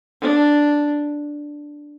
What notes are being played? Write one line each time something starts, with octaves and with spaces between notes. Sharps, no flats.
D4